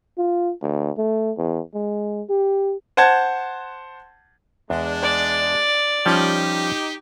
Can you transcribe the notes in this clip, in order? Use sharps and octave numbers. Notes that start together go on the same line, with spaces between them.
F4
D2
A3
E2
G#3
G4
C5 F#5 A5 G#6
E2 G#3 D4
D5
F3 G3 C#4 D#4 G4